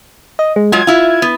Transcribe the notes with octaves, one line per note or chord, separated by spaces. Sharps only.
D#5
G#3
F#3 G#3 F4 G#6
E4 F4
B3